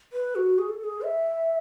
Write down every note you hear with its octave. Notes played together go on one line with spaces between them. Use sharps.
B4
F#4
G#4
A4
A4
G#4
E5